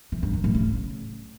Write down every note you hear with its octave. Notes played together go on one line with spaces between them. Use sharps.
E3
G2
F#2
A2
C#3